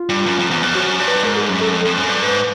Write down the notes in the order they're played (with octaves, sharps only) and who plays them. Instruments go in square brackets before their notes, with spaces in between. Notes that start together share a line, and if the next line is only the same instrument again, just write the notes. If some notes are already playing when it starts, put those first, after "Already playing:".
Already playing: [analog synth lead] F4
[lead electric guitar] G2
F#2
F2
E2
F2
[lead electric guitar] F#2 [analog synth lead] F#4
[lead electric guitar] G2
[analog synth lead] B4
[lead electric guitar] G#2 [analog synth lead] A#4
[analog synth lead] G#4
[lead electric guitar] F#2
[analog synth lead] A4
[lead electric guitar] F2 [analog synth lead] A4
[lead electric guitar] F2
F#2
G2
[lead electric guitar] G#2 [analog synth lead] B4